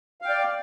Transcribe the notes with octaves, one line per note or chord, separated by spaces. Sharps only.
D5 F5 G5